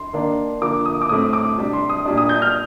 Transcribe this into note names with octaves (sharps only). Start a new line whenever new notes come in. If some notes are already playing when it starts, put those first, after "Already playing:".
Already playing: C6
D#3 A#3 D4
D3 F3 A#3 D6
D#6
D6
A2 A3 C4 D#6
D6
C3 G3 D4
C6
D#6
A#2 G3 D4
D#6
G6
F6